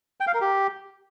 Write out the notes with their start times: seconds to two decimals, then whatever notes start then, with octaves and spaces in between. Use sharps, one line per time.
0.20 G5
0.27 F5
0.34 A#4
0.41 G4